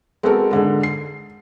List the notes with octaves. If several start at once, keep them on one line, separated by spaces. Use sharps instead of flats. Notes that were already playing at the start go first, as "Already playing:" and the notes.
G#3 B3 C4 F#4 A4 A#4
G#2 D3 G#3
C7